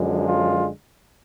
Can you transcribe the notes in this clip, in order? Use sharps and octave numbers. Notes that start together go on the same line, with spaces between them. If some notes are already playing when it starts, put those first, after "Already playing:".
Already playing: F#2 D3 F3 G#3
F4